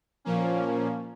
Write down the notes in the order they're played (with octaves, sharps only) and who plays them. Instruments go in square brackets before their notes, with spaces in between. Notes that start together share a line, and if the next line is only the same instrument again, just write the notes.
[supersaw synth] A#2 F3 A#3 C#4